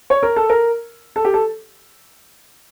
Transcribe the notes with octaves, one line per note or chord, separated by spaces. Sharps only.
C#5
A#4
A4
A#4
A4
G4
A4